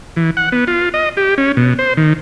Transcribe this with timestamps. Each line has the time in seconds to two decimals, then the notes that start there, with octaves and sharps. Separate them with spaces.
0.16 E3
0.37 F#5
0.52 B3
0.67 F4
0.94 D#5
1.17 G4
1.38 C#4
1.57 B2
1.79 C5
1.97 D#3